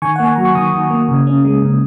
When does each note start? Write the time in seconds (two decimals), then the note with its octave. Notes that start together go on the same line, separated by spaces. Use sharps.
0.02 D#3 G#5 C#6
0.16 A#3 F#5
0.25 G#5
0.36 F#3 A#5
0.45 C#6
0.55 D#3 A#5 D#6
0.73 D#3
0.90 A#3
1.09 C#3
1.27 C#4
1.45 G#3
1.62 C#3